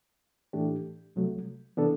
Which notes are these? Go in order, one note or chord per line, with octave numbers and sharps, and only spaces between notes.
A2 E3 A3 D4 G4
C2 C3 F#3 A3
C3 E3 B3 D4 A4